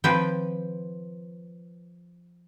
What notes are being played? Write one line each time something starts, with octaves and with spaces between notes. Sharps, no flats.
D#3 F3 C4 B4 G5